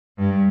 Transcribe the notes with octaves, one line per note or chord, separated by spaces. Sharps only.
G2